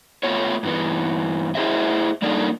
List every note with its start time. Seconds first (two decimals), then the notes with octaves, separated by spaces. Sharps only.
0.23 A3 B3 F4 C#5
0.63 G2 E3 B3
1.55 E4 F#4 G#4 C5 D#5 E5
2.22 G3 A#3 D4 D#4 A4